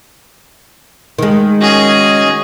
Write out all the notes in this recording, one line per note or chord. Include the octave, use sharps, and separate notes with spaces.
D#3 G#3
C#4 F#4 G#4 D#5